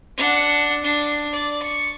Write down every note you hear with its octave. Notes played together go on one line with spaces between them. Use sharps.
D4 F#5
D4
D5
C#6